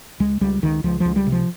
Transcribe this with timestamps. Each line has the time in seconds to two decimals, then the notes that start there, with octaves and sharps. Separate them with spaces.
0.20 C#2 G#3
0.41 C#2 G3
0.62 C#2 D#3
0.84 C#2 F3
1.00 C#2 F3
1.16 G3
1.27 C3
1.32 F3